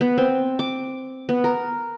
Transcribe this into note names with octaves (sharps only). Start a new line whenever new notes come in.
B3
C4
D6
B3
A#4